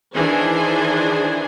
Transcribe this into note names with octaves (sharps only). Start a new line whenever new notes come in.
D#3 E3 D4 G#4 C5 G#5